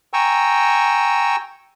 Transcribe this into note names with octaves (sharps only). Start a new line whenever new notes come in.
G5 G#5 A#5 C#6 E6